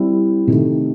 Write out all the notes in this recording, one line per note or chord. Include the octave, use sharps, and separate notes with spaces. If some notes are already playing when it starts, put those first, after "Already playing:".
Already playing: G3 C4 E4
C3 D#3 A3